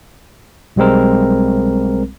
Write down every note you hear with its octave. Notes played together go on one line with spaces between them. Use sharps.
B1 G3 G#3 C4 A#4